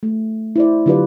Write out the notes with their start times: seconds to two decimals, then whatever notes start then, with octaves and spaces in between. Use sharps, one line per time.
0.03 A3
0.56 E4 C5 D5
0.86 D3 F#3 F4 G4 B4 D5